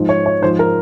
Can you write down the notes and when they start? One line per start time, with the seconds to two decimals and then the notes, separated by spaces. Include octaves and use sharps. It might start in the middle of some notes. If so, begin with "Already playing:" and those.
Already playing: G#2 F3
0.09 C#5
0.26 C#5
0.42 G#2 F3 C5
0.59 A#4